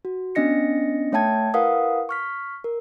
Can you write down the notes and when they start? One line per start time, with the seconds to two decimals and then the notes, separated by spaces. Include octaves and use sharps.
0.05 F#4
0.35 B3 C#4 D4 D#5 A#6 C#7
1.12 A3 C#5 E5 G5 A5 G#6
1.54 E4 A#4 B4 F5 F#5 D#6
2.09 C#6 F6 B6
2.64 A#4